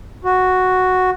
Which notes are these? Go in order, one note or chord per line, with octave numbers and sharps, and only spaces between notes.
F#4